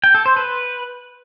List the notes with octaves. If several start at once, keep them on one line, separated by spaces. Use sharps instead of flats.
G5
A4
C5
B4